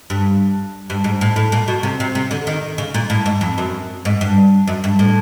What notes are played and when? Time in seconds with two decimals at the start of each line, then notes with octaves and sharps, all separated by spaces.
0.10 G2
0.90 G2
1.04 G#2
1.21 A2
1.36 A2
1.52 A#2
1.68 B2
1.83 C3
2.00 C3
2.15 C3
2.31 D3
2.47 D#3
2.78 C#3
2.94 A#2
3.10 A2
3.26 G#2
3.41 F2
3.58 F#2
4.05 G#2
4.21 G2
4.67 F#2
4.84 G2
4.99 A2